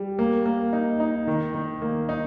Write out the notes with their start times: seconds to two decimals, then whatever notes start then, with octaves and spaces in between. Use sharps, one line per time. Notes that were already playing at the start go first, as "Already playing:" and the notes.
Already playing: G3
0.19 A#3
0.46 A#3
0.73 D#4
1.00 D#4
1.27 D#3
1.54 D#3
1.82 A#3
2.09 D#4